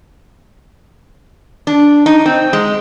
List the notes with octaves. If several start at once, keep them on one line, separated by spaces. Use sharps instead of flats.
D4
D#4
C4
G#3